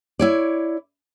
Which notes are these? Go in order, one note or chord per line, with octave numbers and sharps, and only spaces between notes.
E4 C#5 D5